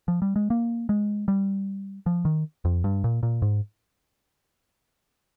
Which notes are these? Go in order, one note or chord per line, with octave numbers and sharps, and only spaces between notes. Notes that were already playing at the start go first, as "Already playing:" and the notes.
F3
G3
G#3
A#3
G#3
G3
F3
D#3
F2
G2
A#2
A#2
G#2